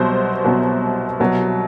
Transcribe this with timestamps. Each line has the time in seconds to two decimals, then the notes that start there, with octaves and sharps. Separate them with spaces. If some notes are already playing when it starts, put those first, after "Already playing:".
Already playing: C2 B2 F#3 C5
0.45 C2 B2 F#3
1.20 C2 B2 F#3